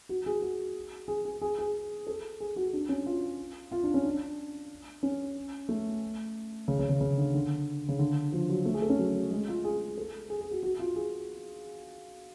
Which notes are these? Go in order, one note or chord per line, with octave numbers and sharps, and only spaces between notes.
F#4
G#4
F#4
G#4
G#4
G#4
G#4
A4
G#4
F#4
D4
C#4
F4
F4
D4
C#4
D4
C#4
A3
C#3
C#3
C#3
C#3
D3
D3
C#3
D3
F3
F#3
A3
G#4
A4
C#4
F#3
G#3
F4
G#4
A4
G#4
G#4
F#4
F#4
F4
G#4